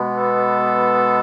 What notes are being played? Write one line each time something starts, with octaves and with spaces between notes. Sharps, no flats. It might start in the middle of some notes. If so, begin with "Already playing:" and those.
Already playing: B2 G#3 B3
A4